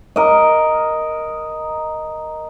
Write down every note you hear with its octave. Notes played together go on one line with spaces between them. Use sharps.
A#4 D#5